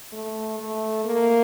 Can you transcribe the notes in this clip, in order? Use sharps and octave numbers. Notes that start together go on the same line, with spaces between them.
A3
A3
A#3